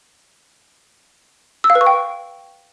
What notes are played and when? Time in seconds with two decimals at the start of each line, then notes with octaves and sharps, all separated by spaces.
1.64 E6
1.70 F5
1.75 B4
1.81 C#6
1.87 G5